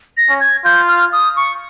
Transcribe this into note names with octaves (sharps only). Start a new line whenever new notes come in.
A#6
C#4
G#6
F4 G6
F6
D#6
C#6